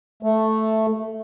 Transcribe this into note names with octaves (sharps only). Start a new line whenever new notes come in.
A3